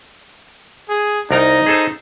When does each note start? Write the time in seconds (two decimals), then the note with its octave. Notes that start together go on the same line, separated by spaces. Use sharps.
0.89 G#4
1.31 C2 D#4 A#4 A#5
1.66 G#4 A4 C5